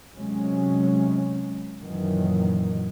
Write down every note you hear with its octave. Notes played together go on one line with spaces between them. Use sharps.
C3 F#3 G#3 C#4
F#2 A#2 D#3 E3 F#3